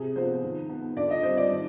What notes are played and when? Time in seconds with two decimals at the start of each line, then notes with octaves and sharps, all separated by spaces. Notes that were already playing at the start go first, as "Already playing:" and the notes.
Already playing: C3 G#4
0.16 F3 B3 C5
0.43 D#3
0.69 B3
0.97 D3 D5
1.11 D#5
1.23 G3 C4 C5
1.37 D5
1.50 D#3